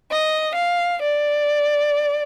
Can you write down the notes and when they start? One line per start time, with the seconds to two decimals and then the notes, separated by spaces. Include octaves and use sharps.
0.11 D#5
0.56 F5
1.02 D5